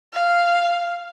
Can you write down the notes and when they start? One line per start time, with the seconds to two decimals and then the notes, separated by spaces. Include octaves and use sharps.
0.13 F5